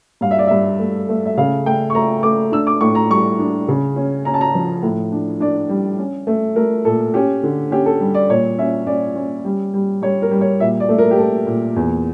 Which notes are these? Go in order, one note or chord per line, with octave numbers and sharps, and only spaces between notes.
G2 F5
E5
D5
G2 E5
A3
A3
E5
C#3 F5
A3 G5
C#6
A3 A#5
A3 D6
D4 E6
D6
A2 C#6
A#5
G3 C#6
D4
C#3
C#4
C#4 A#5
A5
A#5
F3
A2
D4
D4 D5
G3
C#4
A3
A3 A#4
A#2 A4
C#4 G4
D3
C#4 G4
A4
G3
D5
A#2 C#5
C#4 E5
C#4 D5
C#4
G3
G3
G3 C#5
A#4
G3
C#5
A#2 E5
D5
A3
A#4
G4
A3 A4
A#2
E2